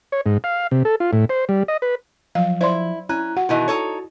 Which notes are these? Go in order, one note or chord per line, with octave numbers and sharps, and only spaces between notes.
C#5
G#2
F5
C3
A4
F4
A2
C5
G3
D#5
B4
F3 F#3 F5
E4 C5 D5 C6
C#4 E4 A#5 F#6
F#4 F#5
B2 D#3 E3 E4 D#5
D#4 A4 C#5